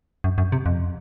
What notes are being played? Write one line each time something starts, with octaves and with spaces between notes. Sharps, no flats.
F#2
F#2
C3
F2